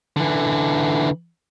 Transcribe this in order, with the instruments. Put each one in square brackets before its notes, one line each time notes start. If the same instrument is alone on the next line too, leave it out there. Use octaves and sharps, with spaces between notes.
[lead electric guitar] D3 E3